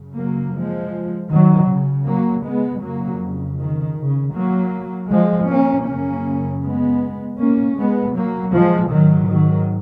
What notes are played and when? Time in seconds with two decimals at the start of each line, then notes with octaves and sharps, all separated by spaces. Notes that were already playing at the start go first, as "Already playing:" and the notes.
Already playing: F#2 C#3
0.16 F#3 A#3
0.54 F3 G#3
1.31 D#3 F#3
1.69 C#3
2.07 F#3 A#3
2.45 G#3 B3
2.82 F2 C#3 F#3 A#3
3.58 D#3
3.98 C#3
4.35 F#3 A#3
5.10 F3 G#3
5.49 A#3 C#4
5.87 F#2 C#3 A#3 C#4
6.63 G#3 B3
7.39 A#3 C#4
7.77 G#3 B3
8.15 F#3 A#3
8.54 F3 G#3
8.91 G#2 D#3 F#3
9.29 D#3 F#3